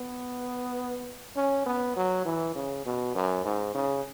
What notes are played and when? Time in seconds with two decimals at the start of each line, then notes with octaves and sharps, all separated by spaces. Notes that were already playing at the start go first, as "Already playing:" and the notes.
Already playing: B3
1.36 C#4
1.66 B3
1.96 F#3
2.25 E3
2.55 C#3
2.86 B2
3.15 F#2
3.45 G#2
3.75 C#3